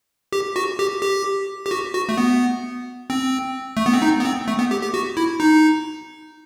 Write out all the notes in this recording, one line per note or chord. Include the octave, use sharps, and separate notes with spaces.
G4
F#4
G4
G4
G4
F#4
F#4
A3
B3
C4
A3
B3
C4
D#4
B3
C4
A3
B3
G4
G4
F#4
E4
D#4